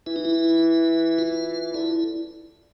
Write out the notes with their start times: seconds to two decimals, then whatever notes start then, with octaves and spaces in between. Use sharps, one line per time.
0.07 E3 E4
0.16 D#4
0.25 E4
1.18 F4
1.74 D3 E4